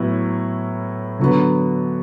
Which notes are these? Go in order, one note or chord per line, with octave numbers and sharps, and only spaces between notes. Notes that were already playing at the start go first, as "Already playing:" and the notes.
Already playing: A2 F#3 B3 E4
D3 F#3 B3